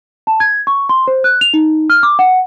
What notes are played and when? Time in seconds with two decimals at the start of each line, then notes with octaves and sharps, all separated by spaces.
0.27 A5
0.40 G#6
0.67 C#6
0.89 C6
1.08 C5
1.24 F#6
1.41 F7
1.54 D#4
1.90 F6
2.03 D6
2.19 F#5